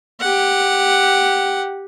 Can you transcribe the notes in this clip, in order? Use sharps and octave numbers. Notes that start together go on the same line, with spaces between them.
G4 F#5